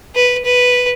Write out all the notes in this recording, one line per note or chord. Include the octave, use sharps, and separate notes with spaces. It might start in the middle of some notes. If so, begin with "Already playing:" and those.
B4
B4